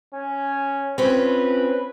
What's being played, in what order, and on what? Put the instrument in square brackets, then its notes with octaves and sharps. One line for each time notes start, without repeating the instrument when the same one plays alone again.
[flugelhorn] C#4
[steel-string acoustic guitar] C4 C#4 F4 [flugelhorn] B4